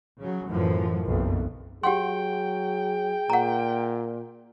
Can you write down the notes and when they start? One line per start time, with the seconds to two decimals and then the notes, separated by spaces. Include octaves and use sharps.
0.19 C#3 F#3
0.48 F#2 A2 E3 F3
1.05 F#1 B1 F2
1.84 F#3 G4 G#4 F#5 G5 C6
3.30 A#2 F#5 A#5